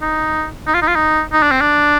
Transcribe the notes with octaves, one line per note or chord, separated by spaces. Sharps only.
D#4
D#4
F4
D#4
F4
D#4
D#4
D4
C4
D4